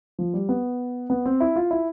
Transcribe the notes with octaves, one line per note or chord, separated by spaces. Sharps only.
F3
G3
B3
B3
C4
E4
F4
E4